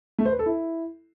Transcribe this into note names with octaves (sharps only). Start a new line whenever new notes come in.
A3
C5
B4
A4
E4